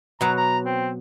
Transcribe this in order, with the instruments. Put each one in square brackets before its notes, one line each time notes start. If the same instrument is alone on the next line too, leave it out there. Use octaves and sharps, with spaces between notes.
[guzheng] B2 F#3 [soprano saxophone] A#5
[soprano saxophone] A#5
C4